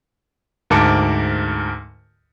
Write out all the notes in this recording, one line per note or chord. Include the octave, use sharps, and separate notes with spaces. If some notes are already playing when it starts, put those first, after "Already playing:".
D2 G#2 A#4 A5 D6 C#7